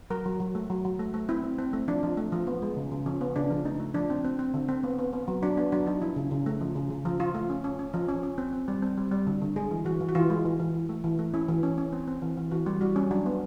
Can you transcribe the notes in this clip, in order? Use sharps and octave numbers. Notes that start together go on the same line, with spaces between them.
F#3 A#4
F#3
F#3
A3
F#3
F#3
A3
A3
C4 E4
C4
C4
A3
F3 D4
F3
A3
F3
B3
G#3
C#3
C#3
F3 C#4
B3
C#3 D4
F3
A3 D#4
A3
F3 D4
C4
C4
C4
D3
C4
B3
B3
B3
F#3
F#3 D4
B3 D4
F#3 D4
F#3 D#4
F3 E4
C#3
C#3
A3
F3
C#3
C#3
F3
F3 F4
A3
C#4
C#4
C#4
F3
C#4
C#4
C4
C4
G3
C4
G3
G3
D3
D3
G#3 G#4
E3
E3 F#4
E3
F#4
E3 F4
G#3
E3
E3
E3
A3
E3
A3
C#4 E4
E3
C#4
C#4
C4
C4
E3
E3
E3 F#4
G3
G3 F#4
G3 C#4
F#3 D4
B3